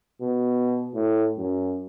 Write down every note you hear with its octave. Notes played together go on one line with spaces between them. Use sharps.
B2
A2
F#2